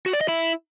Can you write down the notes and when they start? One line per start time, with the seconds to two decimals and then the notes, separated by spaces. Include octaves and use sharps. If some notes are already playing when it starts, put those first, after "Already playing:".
0.06 F#4
0.13 D5
0.21 D#5
0.28 E4